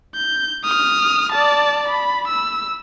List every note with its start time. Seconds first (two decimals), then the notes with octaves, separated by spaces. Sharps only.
0.15 G6
0.64 D#6 F6
1.33 D5 A5
1.88 B5
2.28 E6